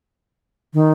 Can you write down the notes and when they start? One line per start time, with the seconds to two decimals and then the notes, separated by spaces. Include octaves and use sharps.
0.74 D#3